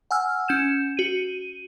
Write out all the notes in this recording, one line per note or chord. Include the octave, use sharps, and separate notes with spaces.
F#5 G#5 E6 F6
C#4 G6 E7
F#4 D#7